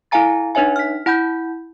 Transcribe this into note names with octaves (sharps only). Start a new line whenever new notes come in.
E4 A4 F5 G#5 A#5 A6
D4 D#4 B4 C#5 E5 G#5
F6 B6
E4 F#5 B5 G6